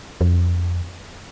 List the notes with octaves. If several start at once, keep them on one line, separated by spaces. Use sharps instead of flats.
F2